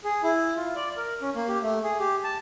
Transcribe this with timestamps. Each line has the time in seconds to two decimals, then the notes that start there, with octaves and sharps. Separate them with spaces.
0.04 G#4
0.23 E4
0.56 F4
0.75 D5
0.97 A#4
1.22 C#4
1.35 A#3
1.48 G4
1.62 A3
1.83 G#4
1.99 G4
2.24 A5